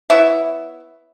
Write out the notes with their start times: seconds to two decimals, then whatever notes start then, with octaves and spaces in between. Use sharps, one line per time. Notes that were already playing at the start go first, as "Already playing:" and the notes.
0.10 B3 E4 C#5 E5